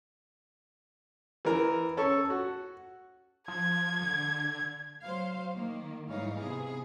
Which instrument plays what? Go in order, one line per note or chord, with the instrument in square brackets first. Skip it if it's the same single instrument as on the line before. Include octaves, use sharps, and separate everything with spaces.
[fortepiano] E3 A#4
C#4 A4 C#6
F#4
[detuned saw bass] F3 [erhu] G#6
[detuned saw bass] D3
[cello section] F#3 C5 F5
D#3 A#3
G#2 E3 G3 D#4 C#5 F5
C3 B3 G#4